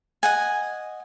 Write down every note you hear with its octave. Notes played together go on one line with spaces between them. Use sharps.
D#5 F#5 G#5